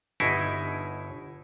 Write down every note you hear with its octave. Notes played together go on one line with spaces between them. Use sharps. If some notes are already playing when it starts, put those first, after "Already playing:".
G1 B2 D#4 E4 G#5